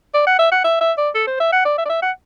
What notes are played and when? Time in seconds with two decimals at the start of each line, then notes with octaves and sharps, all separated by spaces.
0.14 D5
0.27 F#5
0.39 E5
0.52 F#5
0.64 E5
0.81 E5
0.98 D5
1.15 A4
1.27 C5
1.40 E5
1.52 F#5
1.65 D5
1.78 E5
1.85 D5
1.90 E5
2.02 F#5